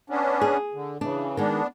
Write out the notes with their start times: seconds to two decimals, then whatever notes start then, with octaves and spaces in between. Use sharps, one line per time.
0.10 B3 C#4 D4
0.41 G#4
0.74 D3
1.01 C#3 E3 D4
1.37 D#3 G#3 B3 D4